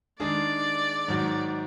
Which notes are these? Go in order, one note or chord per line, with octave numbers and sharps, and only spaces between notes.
D#3 G#3 D4 G#4 D5
G#2 D#3 F#3